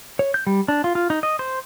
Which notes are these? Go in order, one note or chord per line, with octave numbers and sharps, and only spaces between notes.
C#5
G6
G3
D4
F4
F4
D#4
D#5
C5